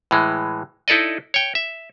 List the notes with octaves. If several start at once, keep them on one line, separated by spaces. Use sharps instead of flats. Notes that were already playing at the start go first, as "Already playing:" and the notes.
A2 E3 G#3
D#4 E4 A4 D5 D#5
C#5 G5
E5